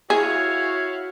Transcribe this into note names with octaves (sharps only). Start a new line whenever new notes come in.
E4 F#4 G#4 C#5 F5